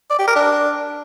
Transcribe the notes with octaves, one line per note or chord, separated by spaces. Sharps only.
D5
G4
A#4
D4